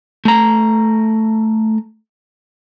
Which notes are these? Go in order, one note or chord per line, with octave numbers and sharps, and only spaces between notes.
A3 A#5